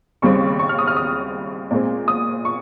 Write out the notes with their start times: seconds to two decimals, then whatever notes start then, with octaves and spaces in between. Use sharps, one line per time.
0.22 D#2 C#3 G3 C4 C#6
0.59 C#6
0.69 F6
0.79 D#6
0.87 F6
0.97 D#6
1.71 A#2 G#3 C4
2.08 D#6
2.45 C#6